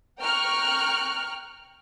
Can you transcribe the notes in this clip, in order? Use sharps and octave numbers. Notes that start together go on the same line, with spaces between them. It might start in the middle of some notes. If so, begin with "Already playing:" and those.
G5 A#5 C#6 F6 F#6